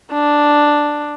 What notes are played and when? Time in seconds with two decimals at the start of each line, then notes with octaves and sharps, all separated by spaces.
0.12 D4